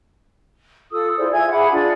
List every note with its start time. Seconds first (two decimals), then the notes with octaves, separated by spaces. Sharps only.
0.92 F4 A4 D#6 E6
1.17 E4 G#4 C5 D5
1.31 F4 E5 G#5 G#6
1.50 G#4 F#5 B5 D6
1.72 D4 F4 G#4 D5